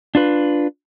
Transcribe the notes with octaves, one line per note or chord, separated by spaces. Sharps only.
D4 F4 B4